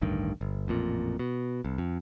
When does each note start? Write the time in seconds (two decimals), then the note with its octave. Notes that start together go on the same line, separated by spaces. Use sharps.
0.02 A1 D2 G2 D#3
0.41 G1
0.68 A1 F2 A#2
1.19 B2
1.65 C2
1.78 F2